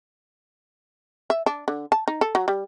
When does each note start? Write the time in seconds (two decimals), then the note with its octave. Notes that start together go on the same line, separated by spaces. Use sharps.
1.30 E5
1.46 D4
1.68 D3
1.92 A5
2.08 D#4
2.21 A4
2.35 F#3
2.48 G3